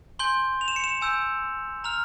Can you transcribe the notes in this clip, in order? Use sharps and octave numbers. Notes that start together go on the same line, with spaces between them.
G#5 C6 G6 G7
F7
E7
C#7
E7
G#5 E6 G6
A#5 F6 F7